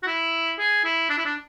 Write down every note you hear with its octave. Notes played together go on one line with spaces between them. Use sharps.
F#4
E4
G#4
E4
D4
E4
D4